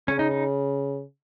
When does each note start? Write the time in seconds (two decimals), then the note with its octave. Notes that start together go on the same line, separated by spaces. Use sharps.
0.08 C#3 C#4
0.19 D#4
0.31 D#4